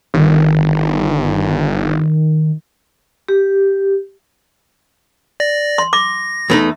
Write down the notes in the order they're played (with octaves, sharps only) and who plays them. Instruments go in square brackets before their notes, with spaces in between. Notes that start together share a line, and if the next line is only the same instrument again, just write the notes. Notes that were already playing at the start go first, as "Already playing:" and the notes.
[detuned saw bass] G1 [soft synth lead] D#3
[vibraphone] G4
[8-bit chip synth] D5 A#6
[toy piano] C6
[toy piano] D6 [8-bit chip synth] A#6
[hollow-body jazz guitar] E2 A3 D#4